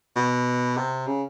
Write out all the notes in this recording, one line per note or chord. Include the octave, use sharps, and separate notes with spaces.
B2
C3
C#3